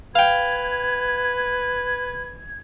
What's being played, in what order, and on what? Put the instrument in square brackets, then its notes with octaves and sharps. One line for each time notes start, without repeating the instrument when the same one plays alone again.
[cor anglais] B4 [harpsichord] F5 G5 [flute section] G#6